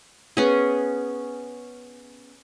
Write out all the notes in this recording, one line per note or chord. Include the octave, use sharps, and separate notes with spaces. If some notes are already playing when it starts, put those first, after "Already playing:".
B3 C#4 G#4